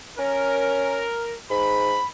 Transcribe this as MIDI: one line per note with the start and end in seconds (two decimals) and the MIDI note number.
0.19 1.03 61
0.19 1.35 70
1.50 1.99 44
1.50 2.06 83